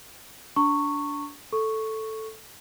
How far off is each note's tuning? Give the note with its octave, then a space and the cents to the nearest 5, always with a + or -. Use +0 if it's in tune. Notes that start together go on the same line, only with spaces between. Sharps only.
D4 -20 A#5 -40 C#6 +0
A4 +0 C#6 +0